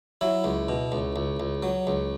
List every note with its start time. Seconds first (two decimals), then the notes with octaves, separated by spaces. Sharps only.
0.21 F#3 E4
0.44 C#2
0.69 B2
0.92 C#2
1.16 C#2
1.40 C#2
1.63 F#3
1.87 C#2